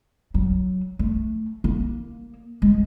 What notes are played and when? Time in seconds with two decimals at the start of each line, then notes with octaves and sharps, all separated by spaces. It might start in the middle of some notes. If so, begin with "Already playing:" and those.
0.34 F#3
0.99 A3
1.64 A#3
2.62 G#3